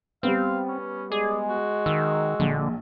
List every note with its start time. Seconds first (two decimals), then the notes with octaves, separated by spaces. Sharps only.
0.23 G3 B3 C4 F5
0.69 C#4
1.12 G#3 G#4 D5
1.50 F#4
1.86 D#3 E6
2.40 A#1 D3